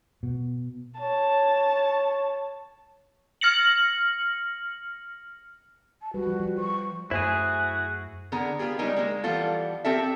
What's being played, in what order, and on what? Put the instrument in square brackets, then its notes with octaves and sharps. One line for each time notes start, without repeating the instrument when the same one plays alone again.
[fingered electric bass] B2
[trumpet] C#5 [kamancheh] A5
[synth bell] F6 A#6 C#7 F#7
[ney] A5
[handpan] G3 B4 [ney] F#4
[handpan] F3
F3
[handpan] C5 [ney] C#6
[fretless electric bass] F#2 A3 [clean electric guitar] E4 G#4 [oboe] F#4 [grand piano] C5 G#5
[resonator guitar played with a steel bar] D3 B3 G#4 A#4 A#5
B3 F4 G4 G#4
G3 G#3 C#4 D#4 G4 A#4
G#3 A#3
E3 F3 G3 B3 F4 A4
C4 G4 A4 A#4 E5